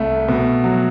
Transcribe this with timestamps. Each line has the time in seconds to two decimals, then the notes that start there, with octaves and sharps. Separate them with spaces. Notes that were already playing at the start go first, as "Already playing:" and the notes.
Already playing: C2 A3
0.29 B2
0.64 F#3